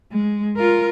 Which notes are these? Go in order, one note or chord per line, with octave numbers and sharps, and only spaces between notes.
G#3
F4 A#4